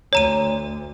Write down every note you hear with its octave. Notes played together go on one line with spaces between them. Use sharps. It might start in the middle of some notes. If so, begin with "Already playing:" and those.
D2 C#5 A#5 D#7